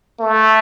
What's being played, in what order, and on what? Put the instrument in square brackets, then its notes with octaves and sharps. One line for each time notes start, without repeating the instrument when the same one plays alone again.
[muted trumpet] A3